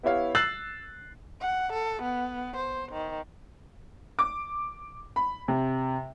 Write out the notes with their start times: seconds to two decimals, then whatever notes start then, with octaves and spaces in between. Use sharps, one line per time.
0.03 B3 E4 G4 C#5 F5
0.35 E6 F#6 A6 C7 F#7
1.41 F#5
1.73 A4
2.02 B3
2.57 C5
2.92 D#3
4.19 D6
5.16 B5
5.48 C3